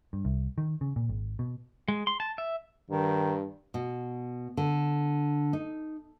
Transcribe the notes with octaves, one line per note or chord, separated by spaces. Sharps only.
G2
C2
D#3
C#3
A#2
G#1
B2
G#3
C6
A5
E5
G2 D#3
B2
D3
D#4